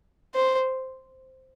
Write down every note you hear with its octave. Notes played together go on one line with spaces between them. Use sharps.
C5